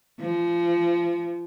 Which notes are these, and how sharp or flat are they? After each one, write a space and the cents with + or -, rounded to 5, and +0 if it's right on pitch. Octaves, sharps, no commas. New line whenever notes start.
F3 -25